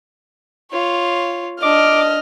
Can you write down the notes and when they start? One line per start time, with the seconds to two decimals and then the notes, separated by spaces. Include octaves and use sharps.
0.72 F4 C#5
1.62 D4 D#5 D6 F6